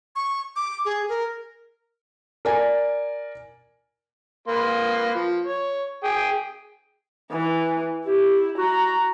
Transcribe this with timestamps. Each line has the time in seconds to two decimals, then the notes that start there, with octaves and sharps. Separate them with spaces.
0.16 C#6
0.56 D6
0.85 G#4
1.09 A#4
2.45 A#4 D5 G#5
4.48 A#3 B4 C6
5.15 F3
5.47 C#5
6.04 G#4 G5
7.31 E3
8.05 E4 G4
8.58 F#4 A#5